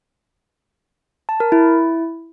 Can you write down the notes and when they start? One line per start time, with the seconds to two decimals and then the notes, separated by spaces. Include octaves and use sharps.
1.29 A5
1.40 A#4
1.52 E4